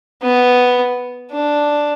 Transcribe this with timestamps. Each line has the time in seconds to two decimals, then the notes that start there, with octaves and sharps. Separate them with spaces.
0.23 B3
1.32 D4